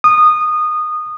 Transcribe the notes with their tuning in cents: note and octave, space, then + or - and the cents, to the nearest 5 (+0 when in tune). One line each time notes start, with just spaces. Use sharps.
D#6 -20